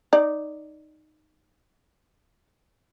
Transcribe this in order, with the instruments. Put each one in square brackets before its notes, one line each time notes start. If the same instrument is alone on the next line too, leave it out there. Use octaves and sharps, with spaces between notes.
[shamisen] D#4 D5